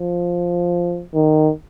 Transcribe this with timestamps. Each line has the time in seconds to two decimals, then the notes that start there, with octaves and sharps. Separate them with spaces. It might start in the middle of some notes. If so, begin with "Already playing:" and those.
Already playing: F3
1.14 D#3